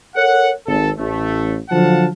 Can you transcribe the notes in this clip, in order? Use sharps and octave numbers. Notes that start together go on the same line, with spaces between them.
A4 A#4 C#5 F#5
G#1 A4
A1 A3
D3 F3 F#3 F5 F#5 A5